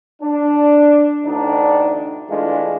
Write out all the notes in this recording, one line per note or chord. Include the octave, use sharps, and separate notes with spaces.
D4
A1 D2 D4 D#4
E3 G#3 A3 D4 F4